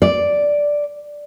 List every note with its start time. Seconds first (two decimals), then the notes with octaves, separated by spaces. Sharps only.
0.02 D5